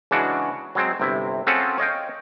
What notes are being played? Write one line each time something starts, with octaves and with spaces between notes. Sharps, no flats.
C#3 E3 G#3 D4 F#4
F#3 G#3 C4
G1 C3 E4
C4 C#4 F4 G#4 A4 F#5
C#5 D#5 F5 G5